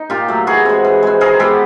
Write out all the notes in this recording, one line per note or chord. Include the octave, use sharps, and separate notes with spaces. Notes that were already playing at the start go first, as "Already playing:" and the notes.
Already playing: D#4
A#2 F4 G4
F#3 A3
E3 F#4 G#4
G#3 C4
E3
G#3 C4
D#3 G#4 A#4
G#3 B3 G4 A4